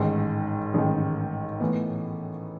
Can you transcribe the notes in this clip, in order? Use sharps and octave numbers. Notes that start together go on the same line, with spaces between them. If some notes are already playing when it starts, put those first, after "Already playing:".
Already playing: A1 G#2 D#3
A1 G#2 D#3
A2 E3 B3